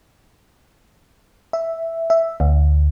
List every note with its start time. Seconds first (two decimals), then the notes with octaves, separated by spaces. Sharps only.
1.53 E5
2.10 E5
2.40 D2